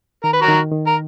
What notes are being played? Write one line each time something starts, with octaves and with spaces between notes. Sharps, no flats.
D#3 A#4
B4
F#4 A#4
D#3
D#3
A#4